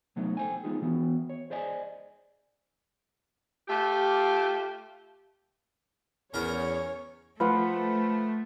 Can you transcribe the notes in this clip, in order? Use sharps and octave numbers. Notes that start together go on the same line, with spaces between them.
C3 F#3 A3 B3 D#4
A4 B4 C5 G5 G#5
G#3 B3 D#4 F4 G#4
E3 B3 F#4
C#5
G#4 C5 D5 D#5 G#5
A3 F4 G4
E2 C#4 A#4 C#5
F3 A3 B4 C5 F#5